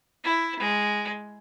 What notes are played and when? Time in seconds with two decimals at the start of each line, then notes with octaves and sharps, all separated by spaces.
0.24 E4
0.59 G#3